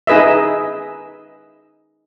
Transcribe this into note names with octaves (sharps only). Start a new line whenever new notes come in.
D#4 G#4 B4 D#5 E5